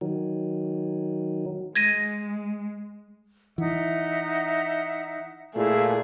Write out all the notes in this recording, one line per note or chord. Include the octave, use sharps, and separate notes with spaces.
D#3 F#3
G#3 G#6 A#6 D#7
E3 D#4 E5 F#5
A#2 A3 E4 G#4 F5